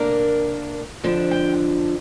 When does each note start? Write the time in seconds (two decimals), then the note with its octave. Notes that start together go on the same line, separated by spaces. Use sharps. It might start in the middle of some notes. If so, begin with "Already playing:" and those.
Already playing: C3 A#3 D4 A#4
1.04 F2 D3 F3 D4
1.31 G5